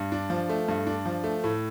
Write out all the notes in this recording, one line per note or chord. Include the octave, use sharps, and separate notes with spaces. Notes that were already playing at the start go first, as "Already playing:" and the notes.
Already playing: G2
D4
F3
A3
G2
D4
F3
A3
A2